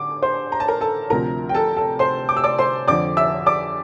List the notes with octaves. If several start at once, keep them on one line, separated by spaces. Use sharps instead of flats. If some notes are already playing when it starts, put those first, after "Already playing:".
Already playing: D3 D6
C5 C6
A#5
A5
A#4 A#5
A4 A5
D2 C3 F3 A#4 A#5
G5
A4 A5
A4 A5
C5 C6
D6
E6
D5 D6
C5 C6
F2 D3 F3 D5 D6
E5 E6
D5 D6